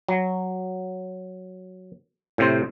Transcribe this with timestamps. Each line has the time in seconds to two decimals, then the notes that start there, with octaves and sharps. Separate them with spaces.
0.09 F#3
2.38 A2 C3 C5